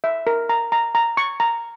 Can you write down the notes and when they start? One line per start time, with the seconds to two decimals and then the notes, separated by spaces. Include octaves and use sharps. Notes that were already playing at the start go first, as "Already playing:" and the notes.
0.04 E5
0.27 A#4
0.49 A#5
0.72 A#5
0.95 A#5
1.17 C#6
1.40 A#5